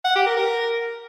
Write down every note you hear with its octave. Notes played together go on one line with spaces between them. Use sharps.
F#5
G4
A#4
A#4